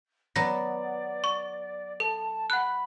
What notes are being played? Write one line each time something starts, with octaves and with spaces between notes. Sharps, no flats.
F#3 B3 D5 A#6
C#6
A4 A5
F#5 B5 F#6